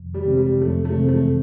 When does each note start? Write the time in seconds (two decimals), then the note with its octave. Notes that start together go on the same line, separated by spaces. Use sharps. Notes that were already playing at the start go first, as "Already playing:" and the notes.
Already playing: F2
0.14 G3
0.26 C3 E3 G#3 C4
0.37 G3
0.61 F2 A3
0.85 A3
0.97 C3 E3 G#3 C4
1.09 A3